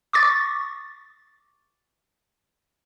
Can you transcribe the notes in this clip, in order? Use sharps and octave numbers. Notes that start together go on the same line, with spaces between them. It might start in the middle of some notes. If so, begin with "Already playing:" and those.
C#6 D6 A6